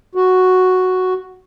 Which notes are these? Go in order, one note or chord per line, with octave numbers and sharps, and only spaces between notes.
F#4